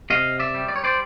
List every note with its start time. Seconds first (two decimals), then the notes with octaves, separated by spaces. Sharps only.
0.10 C3 D#5 F5
0.39 D5 E5
0.54 G3
0.68 D5
0.76 C#5
0.84 C5 D5